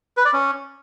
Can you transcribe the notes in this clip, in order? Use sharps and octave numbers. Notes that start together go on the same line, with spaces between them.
B4
D5
C#4